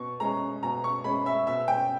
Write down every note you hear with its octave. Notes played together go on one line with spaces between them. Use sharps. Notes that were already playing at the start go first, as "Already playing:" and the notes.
Already playing: B2 C#6
G#3 C#4 A#5
B2 A#5
C#6
G#3 C#4 B5
E5
B2 E5
G5